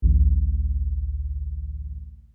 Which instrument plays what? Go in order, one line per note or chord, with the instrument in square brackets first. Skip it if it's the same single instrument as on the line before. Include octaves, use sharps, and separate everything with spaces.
[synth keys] A1 D2